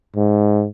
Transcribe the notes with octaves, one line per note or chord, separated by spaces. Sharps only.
G#2